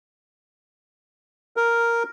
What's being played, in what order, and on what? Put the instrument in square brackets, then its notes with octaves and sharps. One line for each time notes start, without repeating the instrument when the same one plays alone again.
[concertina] A#4